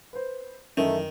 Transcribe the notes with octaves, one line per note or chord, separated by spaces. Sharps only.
B4 C5
F#2 D#3 E3 A3 C#4 D#4